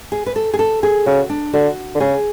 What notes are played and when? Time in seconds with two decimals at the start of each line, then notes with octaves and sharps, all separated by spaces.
0.12 G#4
0.26 B4
0.36 A4
0.53 G#4
0.59 A4
0.83 G#4
1.06 C#3 F#4
1.29 D4
1.53 D3 F#4
1.95 D3
2.00 C#3 G#4